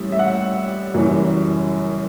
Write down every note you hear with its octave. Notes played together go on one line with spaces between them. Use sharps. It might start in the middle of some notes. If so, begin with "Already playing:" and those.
Already playing: A1 A2 G3
E5
F#5
F#1 F#2 E3 G3